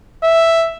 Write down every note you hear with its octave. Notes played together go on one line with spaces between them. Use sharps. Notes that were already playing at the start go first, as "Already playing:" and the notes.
E5